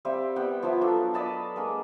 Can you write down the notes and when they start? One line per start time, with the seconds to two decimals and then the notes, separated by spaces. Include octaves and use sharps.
0.05 G3 C4 E5 F5
0.36 G3 B3 F#5 G5
0.62 F3 B3 E4 E5
0.81 F#3 D4 A4 F5
1.14 D5 D#5 A5 B5
1.56 G#3 A#3 D4